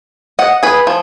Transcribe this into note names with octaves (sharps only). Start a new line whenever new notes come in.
D#5 F#5
G#4 B4
F3